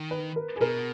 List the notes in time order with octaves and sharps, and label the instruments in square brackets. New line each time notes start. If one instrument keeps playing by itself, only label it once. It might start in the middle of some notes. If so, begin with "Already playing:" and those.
Already playing: [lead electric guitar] D#3
[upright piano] B4
A#4
G#4
[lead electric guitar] B2 [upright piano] A#4